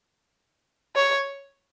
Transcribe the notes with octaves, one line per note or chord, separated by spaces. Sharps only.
C#5